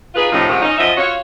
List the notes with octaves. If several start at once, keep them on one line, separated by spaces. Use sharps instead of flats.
D#4 F4 G#4 B4
A2 C3 F3 C#4 D#4
G#2 C3 D#3 F3
C#4 D#4
F#2 F3 D#5 E5
F4 F#4 C#5